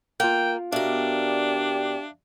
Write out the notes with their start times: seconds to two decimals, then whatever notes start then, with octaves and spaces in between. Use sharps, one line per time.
0.20 A#3 F4 F5 G5
0.72 B2 D4 G4 A#4 D5 E5 F5